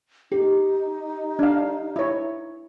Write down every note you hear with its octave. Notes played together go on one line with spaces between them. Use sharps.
D#4 G4
D4 F5
E4 C#5